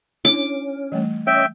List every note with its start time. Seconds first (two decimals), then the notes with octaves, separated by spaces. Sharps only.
0.25 C#4 D4 E4 D6
0.92 E3 G3 A3
1.27 C#4 C#5 D#5 E5 G5